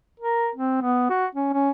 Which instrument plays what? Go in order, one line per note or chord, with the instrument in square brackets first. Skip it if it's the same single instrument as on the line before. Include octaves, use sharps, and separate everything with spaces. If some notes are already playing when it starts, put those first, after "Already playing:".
[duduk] A#4
C4
B3
F#4
C#4
C#4